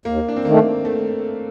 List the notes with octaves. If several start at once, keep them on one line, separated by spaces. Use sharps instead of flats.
D#2 A#3
D4
C4
D#3 A3 A#3
A3